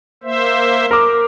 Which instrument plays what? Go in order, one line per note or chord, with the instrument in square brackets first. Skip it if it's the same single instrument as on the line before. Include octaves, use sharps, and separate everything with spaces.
[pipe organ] A#3 C5 E5
[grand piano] A#4 D6